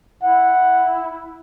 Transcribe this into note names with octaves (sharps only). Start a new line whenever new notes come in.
E4 F#5